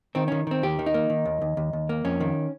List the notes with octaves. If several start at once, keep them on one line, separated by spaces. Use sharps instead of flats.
D#3 C4
D#3 C#4
D#3 C4
D#2 G4
D#3
D#4
A#3
D#3
D#2
D#2
D#2
D#2
A#3
F2 C#4
D#3